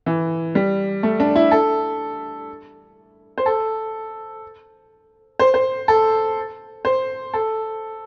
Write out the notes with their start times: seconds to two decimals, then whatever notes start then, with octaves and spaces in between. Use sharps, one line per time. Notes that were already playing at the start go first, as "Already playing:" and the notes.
0.06 E3
0.55 G3
1.03 A3
1.20 D4
1.36 E4
1.51 A4
3.38 C5
3.46 A4
5.40 C5
5.54 C5
5.88 A4
6.85 C5
7.34 A4